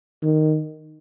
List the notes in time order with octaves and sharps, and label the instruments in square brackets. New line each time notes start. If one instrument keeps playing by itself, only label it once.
[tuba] D#3